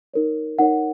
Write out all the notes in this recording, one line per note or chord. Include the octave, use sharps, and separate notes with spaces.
D#4 A#4 C#5
D#4 A#4 C#5 F#5